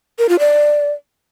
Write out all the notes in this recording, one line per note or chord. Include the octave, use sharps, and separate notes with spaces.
A#4
F4
D5